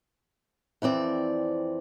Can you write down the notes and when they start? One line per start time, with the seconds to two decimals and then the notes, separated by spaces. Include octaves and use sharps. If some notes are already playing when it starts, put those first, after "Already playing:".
0.82 F2 E3 C4 D5